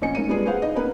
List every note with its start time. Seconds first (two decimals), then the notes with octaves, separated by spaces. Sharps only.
0.02 A#1 C#4 D#5 G#5 C#7
0.15 G#2 C#4 A#4 D#7
0.28 G3 G#3 B3 D4 F4 G#4
0.46 G#4 B4 C5 F5 F#5
0.62 D#4 D#5
0.75 A#3 B3 C#4 D#4 A#4 B4